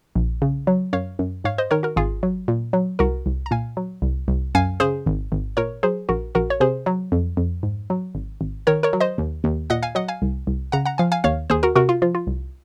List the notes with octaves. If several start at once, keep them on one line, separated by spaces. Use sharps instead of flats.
A#1
C#3
F#3
F#2 C#5 F5
F#2
G#2 C#5 F5
C5 D#5
D#3 A#4 C#5
F#4 A#4
G#1 F4 G#4
F#3
A#2
F#3
C2 F#4 A#4
C2
A#5
A#2 F5 G#5
F#3
C2
C2
F#2 F5 G#5
C#3 G#4 C5
G#1
G#1
A#2 A#4 C#5
F#3 G#4 C5
A#1 F#4 A#4
A#1 F#4 A#4
C#5
C3 G#4 C5
F#3
F2
F2
G#2
F#3
G#1
G#1
D#3 A#4 C#5
A#4 C#5
F#3
C5 D#5
D#2
D#2
A#2 D#5 F#5
F5 G#5
F#3 D#5 F#5
F5 G#5
C2
C2
C#3 F#5 A#5
F#5 A#5
F3 F5 G#5
F5 G#5
D#2 C#5 F5
D#2 G#4 C5
F#4 A#4
C3 F#4 A#4
F4
F3 F4
F4
C2